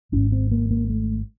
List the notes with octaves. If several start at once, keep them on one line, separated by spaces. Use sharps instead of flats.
G#1 G#2 C#4
C4
A#3
A#3
A3